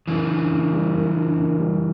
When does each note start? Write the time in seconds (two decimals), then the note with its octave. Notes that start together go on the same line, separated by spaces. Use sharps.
0.07 F#2 C#3 E3
0.29 D3
0.51 F#1
0.73 G3
0.94 F#2
1.16 D3
1.38 F#1
1.60 G3